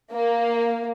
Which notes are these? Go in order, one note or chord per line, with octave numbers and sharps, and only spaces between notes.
A#3